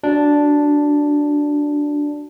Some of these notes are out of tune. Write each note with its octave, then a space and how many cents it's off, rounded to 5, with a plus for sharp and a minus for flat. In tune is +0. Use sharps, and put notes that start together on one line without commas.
D4 -5 F#4 +0